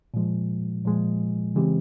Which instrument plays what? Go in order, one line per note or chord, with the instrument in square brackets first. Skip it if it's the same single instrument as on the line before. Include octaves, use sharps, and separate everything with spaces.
[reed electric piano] A#2 F3 G#3
A#2 F3 G#3
C#3 E3 G#3 C4 G4